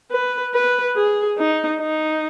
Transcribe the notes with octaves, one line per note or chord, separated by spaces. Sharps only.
B4
B4
G#4
D#4
D#4